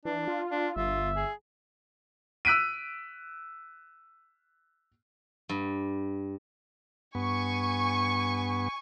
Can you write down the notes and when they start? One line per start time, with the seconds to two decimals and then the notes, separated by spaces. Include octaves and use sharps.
0.05 E3 D4
0.28 F4
0.52 D4
0.76 G1 F4 E5
1.16 G#4
2.45 E6 F#6 B6 D7 D#7
5.49 G2
7.15 G2 B3 G#5 C#6